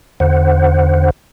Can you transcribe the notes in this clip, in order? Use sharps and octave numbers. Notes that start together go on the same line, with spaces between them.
E2 D3 C5 F#5